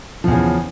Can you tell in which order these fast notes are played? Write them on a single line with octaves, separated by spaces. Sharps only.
F3 E2 C#3